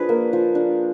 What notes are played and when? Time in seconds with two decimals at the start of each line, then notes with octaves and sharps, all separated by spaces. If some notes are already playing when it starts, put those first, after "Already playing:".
Already playing: F3 D4 G#4 B4
0.09 A#3
0.33 F3
0.55 D4